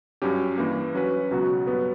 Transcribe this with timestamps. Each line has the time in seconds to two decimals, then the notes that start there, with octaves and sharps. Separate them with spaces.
0.22 G2 F#3 C#4 G4
0.58 G2 E3 A#3
0.95 F#3 C#4 F#4 B4
1.31 C#2 B2 F#3 B3 F#4
1.67 G2 F#3 B3 F#4 B4